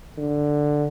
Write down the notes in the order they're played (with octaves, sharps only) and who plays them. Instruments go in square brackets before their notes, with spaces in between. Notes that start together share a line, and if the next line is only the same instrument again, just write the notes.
[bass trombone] D3